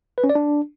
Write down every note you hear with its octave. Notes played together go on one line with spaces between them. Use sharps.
B4
C#4
D5
D4